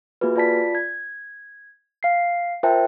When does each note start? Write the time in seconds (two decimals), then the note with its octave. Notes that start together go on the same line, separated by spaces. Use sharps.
0.21 A#3 F4 F#4 G#4 B4
0.36 F4 D5 A5 B6
0.75 G#6
2.03 F5 C7
2.63 F4 A#4 C5 E5 G5 A5